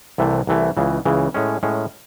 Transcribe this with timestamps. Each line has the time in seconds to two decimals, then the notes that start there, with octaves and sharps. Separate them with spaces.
0.18 C2 C3 E3 A3
0.47 C2 C3 E3 A3
0.77 C#2 C#3 E3
1.05 C#2 C#3 E3
1.34 A2 G#3 C#4
1.63 A2 G#3 C#4